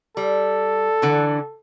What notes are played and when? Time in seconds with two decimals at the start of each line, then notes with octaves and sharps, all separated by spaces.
0.17 G3 A4
1.02 D3 E3